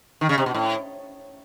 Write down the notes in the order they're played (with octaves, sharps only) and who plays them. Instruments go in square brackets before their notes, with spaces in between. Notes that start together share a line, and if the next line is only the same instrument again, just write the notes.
[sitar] D#3
C#3
C3
B2
A2